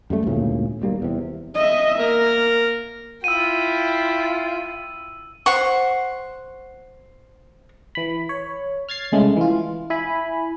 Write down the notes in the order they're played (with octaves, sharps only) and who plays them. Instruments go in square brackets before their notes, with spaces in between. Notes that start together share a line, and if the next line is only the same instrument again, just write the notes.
[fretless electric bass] F#2 G3 A3
G#1 D2 A#2 C#3
B1 G3 A#3
E2 C3
[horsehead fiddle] D#5 E5
[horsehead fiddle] A#3 [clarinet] A#4
[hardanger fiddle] E4 G5 [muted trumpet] F4 [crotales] E6 D#7
[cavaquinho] C5 F#5 C#6
[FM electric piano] E3 B5
C#5
F6 G#6 A6 C7
C2 C#3 G#3 A3
E3 F4
E4 G#5 B5